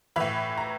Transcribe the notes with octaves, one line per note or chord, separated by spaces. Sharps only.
A2 E3 B5
A#5